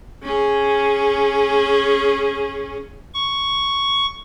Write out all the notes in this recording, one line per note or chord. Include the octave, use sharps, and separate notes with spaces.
C#4 G#4
C#6